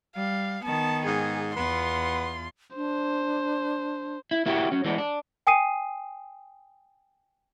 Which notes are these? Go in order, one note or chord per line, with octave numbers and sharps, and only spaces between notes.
G3 F5
D#3 B3 A5
G#2 G#4
E2 B3 F4 C6
D4 C5
E4
A#3 E4 F#4 G4
F#3 C#4
E3 G#3 B3 D4
D4
G5 G#5 D#6 C7 D#7